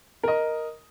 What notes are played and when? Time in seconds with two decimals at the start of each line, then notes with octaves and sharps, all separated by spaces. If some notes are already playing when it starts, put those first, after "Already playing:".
0.23 A#4 D#5